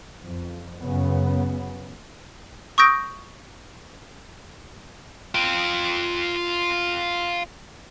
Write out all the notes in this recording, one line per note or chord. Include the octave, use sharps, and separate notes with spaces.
F2
F#2 C#3 B3
C#6 D#6 E6 G6 A#6 D7
F4 G5